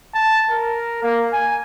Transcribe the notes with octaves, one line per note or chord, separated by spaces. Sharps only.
A5
A#4
A#3
G#5